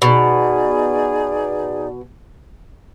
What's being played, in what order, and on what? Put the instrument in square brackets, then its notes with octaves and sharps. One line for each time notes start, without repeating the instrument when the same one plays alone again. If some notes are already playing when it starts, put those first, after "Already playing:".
[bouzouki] B2 [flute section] D#4 G#4 D5